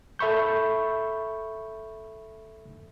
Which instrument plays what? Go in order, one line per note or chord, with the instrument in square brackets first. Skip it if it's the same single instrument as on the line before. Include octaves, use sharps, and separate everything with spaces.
[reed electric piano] A4 E5 B5 C#6 G6